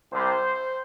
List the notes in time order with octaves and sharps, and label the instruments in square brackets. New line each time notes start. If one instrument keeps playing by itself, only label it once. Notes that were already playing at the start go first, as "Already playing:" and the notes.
[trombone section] C2 C3 G3 C5